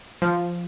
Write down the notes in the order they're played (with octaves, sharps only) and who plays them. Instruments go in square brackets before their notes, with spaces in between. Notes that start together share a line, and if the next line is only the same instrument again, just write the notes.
[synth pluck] F3